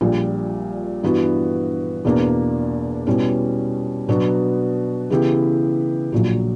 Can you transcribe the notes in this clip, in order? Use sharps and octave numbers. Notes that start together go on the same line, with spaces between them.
A#1 A#2 G3
G2 E3 B3 F#4
E2 B2 A#3 D4
B2 G3 C#4 E4
B2 F#3 B3 D4 F#4
C#3 E3 B3 E4 G4
A#1 A#2 F#3